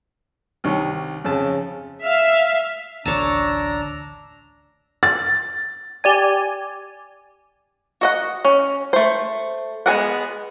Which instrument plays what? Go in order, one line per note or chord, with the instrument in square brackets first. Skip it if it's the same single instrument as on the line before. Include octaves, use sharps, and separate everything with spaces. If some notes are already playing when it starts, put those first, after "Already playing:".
[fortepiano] C2 D#3 C#5
[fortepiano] F2 A5 [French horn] C#3
[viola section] E5 F5
[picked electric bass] A1 D2 [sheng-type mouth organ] D4 A#5 E6 [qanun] C#5 A5
[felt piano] A6
[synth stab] G4 D5 G#5
[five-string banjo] F#4 D#5 F#5
C#4
A3 C5
G#3 B3 G#4 A#4 F#5